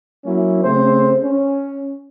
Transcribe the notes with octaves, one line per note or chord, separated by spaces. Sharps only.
F#3 A#3 C#4 E4
C#3 A3 C4 C5
C#4